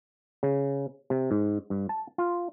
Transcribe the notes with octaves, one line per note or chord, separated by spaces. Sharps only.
C#3
C3
G#2
G2
A5
F4